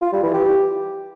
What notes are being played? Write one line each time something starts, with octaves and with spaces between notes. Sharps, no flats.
F4
G3
E3
G4